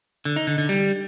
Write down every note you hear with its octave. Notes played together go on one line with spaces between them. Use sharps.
D3
D#4
D3
D3
G3